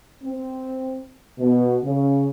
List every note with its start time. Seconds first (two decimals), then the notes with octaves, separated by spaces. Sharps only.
0.23 C4
1.38 B2
1.83 C#3